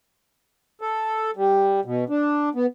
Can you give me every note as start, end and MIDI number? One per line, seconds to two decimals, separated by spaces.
0.81 1.31 69
1.36 1.80 55
1.85 2.04 47
2.09 2.49 62
2.55 2.66 59